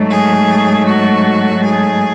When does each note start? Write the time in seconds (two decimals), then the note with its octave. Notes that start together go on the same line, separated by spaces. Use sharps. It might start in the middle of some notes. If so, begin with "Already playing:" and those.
Already playing: G#2 F#3 A3
0.10 G#4
0.87 F#4
1.64 G#4